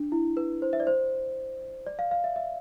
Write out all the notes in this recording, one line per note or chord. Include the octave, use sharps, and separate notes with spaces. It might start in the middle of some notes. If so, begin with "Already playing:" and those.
Already playing: D4
E4
B4
C5
E5
D5
C5
D5
F5
F5
E5
E5